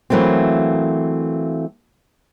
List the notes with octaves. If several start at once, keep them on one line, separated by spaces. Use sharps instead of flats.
E3 F#3 A3 A#3 C4